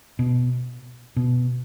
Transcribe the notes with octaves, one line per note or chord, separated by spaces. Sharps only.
B2
B2